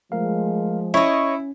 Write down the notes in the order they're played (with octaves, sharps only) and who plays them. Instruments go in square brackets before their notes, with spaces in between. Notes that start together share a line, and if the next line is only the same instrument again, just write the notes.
[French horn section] F3 G#3 [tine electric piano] A3 A#4 F5
[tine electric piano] C#4 [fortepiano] E4 [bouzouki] C#5 D#5